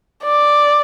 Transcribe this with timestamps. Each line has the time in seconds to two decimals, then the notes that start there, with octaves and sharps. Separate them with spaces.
0.25 D5